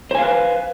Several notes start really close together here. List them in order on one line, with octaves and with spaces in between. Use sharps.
C5 G#5 F5 B4